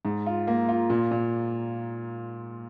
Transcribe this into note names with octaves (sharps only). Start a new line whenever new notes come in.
G#2
F4
A#3
F4
A#2
A#2